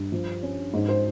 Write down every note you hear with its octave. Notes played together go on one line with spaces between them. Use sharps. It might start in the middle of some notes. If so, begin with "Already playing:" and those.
Already playing: G2
F3
C#4
G#2
C5